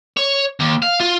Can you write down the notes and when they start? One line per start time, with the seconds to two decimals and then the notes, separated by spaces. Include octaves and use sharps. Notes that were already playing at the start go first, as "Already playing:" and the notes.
0.17 C#5
0.60 D#2
0.82 F5
1.00 F4